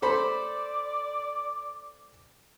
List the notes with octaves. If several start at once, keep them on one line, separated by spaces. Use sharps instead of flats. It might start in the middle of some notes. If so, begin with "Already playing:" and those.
A4 C5 D5 B5